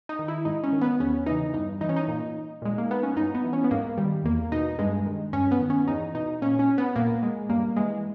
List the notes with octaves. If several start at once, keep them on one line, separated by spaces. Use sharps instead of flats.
D#4
D#3
E4
G#2 D#4
C#4
D#3
B3
E2 C#4
C#3 E3 D#4
G2 D#4
E3 D#4
C#4
D#4
A#2
A#2 G#3
A#3
B3
C#4
G2 D#4
B3
E3
C#4
B3
G#2 A#3
D#3 G3
E2 A#3
B2 D#4
G2 G#3
D#3
G2 C#4
B3
D#3
C#4
E2 D#4
B2 D#4
A#2 C#4
C#4
B3
A#2 A#3
G#3
G2 A#3
E3 G#3